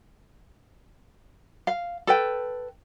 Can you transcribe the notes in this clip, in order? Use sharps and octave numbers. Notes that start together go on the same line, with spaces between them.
F5
A4 B4 G5